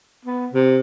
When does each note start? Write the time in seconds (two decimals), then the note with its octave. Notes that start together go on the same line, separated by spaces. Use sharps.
0.25 B3
0.53 C3